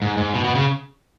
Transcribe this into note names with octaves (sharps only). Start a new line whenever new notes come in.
G#2
G#2
B2
B2
C#3